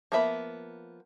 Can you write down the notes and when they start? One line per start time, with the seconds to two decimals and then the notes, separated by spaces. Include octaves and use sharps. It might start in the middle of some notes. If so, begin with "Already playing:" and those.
0.12 F3 A#3 B3 E5 B5